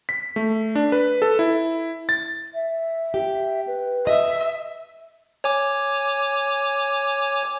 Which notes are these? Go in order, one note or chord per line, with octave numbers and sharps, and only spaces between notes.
B6
A3
D4
B4
A4
E4
A6
E5
G4
B4
D#5 E5
C#5 G#5 D6